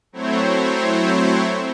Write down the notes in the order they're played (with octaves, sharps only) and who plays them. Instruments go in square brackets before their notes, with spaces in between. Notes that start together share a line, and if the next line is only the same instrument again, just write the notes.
[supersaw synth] F#3 A3 C4 E4 C5 C#5